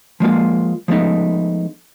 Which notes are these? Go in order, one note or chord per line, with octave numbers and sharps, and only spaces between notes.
F3 G#3 A#3 F4
F3 G#3 A3 B3 D#4